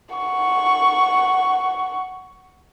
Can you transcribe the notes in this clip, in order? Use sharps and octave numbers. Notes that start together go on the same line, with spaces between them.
F#5 C#6